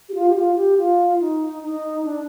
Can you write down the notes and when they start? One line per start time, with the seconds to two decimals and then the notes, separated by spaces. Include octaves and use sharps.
0.09 G4
0.14 F4
0.29 G4
0.36 F4
0.56 G4
0.78 F4
1.21 D#4
1.63 D#4
2.05 D4